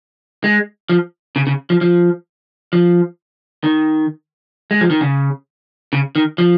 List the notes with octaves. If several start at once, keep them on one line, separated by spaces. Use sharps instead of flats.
G#3
F3
C#3
C#3
F3
F3
F3
D#3
G#3
F3
D#3
C#3
C#3
D#3
F3